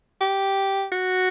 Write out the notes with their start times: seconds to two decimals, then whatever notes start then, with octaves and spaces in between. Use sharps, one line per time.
0.21 G4
0.92 F#4